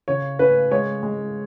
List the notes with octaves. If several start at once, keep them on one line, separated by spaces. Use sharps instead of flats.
C#3 C#5
C#4 B4
G#3 C#5
G#3